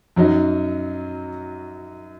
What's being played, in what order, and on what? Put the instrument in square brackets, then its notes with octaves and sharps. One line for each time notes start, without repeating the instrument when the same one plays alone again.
[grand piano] F#2 F#3 D#4